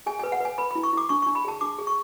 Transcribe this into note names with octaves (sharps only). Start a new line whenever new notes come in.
G#4 G#5
G#5
B4
F#5
B4 G#5
B4 B5
B5
E4
C#6
E4 D6
D4 C#6
C#6
D4
B5
G#4 A5
D4 D6
G#4
C#6